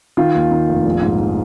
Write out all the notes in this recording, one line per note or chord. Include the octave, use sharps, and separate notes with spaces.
D#3 F4
D#2
D#3
F1
A#1
G#2